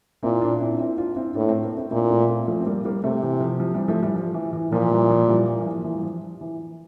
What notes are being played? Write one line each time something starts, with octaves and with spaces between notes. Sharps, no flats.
A#2 C4 E4
A#3 D4
C4 E4
C4 E4
D4 F4
C4 E4
A2 A#3 D4
A3 C4
A#3 D4
C4 E4
A#2 C4 E4
A3 C4
A3 C4
F3 A3
C4
G3 A#3
G3 A#3
C3 A3 C4
E3
F3
F3
E3 G3
F3 A3
E3 G3
F3
E3
E3
A#2 F3
E3 G3
F3
E3 G3
E3
E3
F3
E3
G3
F3
E3